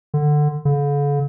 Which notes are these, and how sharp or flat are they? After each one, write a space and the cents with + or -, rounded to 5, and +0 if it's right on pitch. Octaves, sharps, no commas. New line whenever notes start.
D3 +15
D3 -45